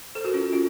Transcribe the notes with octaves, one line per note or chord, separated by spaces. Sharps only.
A4 C5
F#4 A#4
C#4 F4
C#4 F4